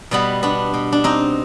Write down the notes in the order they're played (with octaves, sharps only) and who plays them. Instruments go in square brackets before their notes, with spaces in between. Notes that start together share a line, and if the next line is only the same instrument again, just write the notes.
[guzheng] B2 G3 B3
B3 D4
B2
D4
C4 D#4